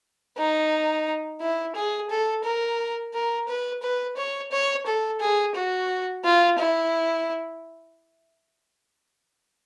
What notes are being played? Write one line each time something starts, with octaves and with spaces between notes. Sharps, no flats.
D#4
E4
G#4
A4
A#4
A#4
B4
B4
C#5
C#5
A4
G#4
F#4
F4
E4